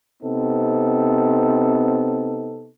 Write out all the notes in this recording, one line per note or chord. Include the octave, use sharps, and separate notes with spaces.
C3 B3 C4 D#4 A4